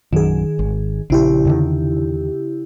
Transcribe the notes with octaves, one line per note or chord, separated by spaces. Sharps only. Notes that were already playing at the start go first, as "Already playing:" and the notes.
A#1 F#2 D#3 G#4
G#1
A#1 C#3 E4 G4
E2 D3 D#3